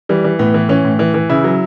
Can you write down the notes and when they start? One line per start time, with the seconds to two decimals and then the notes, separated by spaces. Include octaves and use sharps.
0.09 E3 G3
0.24 E3
0.39 A2 B3
0.54 E3
0.69 E3 C#4
0.84 A2
0.99 E3
1.14 E3
1.29 C#3 E4
1.44 F#3